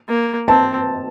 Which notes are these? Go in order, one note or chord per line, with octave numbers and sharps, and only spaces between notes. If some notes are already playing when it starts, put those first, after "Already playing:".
A#3
C4 A5